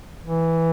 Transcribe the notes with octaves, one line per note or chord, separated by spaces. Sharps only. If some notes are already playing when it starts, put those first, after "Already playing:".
E3